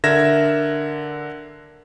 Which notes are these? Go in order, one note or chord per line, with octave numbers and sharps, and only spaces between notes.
D3 A#4 E5 G#6 A#6 E7